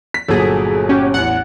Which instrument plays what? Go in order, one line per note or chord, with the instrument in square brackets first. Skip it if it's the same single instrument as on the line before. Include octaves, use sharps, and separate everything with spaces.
[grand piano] B6
[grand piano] G1 A#2 F#3 [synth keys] G#4 A4
[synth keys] C#4 F#4 G4
[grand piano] A1 E2 [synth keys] F#5